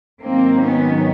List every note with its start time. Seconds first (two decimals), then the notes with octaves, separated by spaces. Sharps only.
0.23 G#2 D#3 F#3 A#3 C4
0.64 B3 C#4